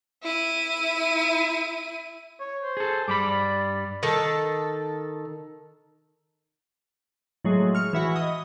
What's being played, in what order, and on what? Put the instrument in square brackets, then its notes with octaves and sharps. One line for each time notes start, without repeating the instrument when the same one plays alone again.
[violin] E4 D#7
[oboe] C#5
C5
[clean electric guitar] G#4 A4
[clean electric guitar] G2 G3 B5 [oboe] D6
[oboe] D5
[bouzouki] D#3 A4
[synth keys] A2 F#3 G#3
C#6 F6
E3 E4 F#4
D#5